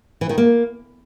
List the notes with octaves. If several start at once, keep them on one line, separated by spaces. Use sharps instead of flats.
E3
D#3
A#3